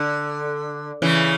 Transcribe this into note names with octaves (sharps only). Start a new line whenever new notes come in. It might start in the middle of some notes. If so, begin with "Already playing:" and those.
Already playing: D3
C#3 E3